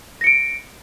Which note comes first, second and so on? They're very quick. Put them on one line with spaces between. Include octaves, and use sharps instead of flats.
A#6 C#7 D7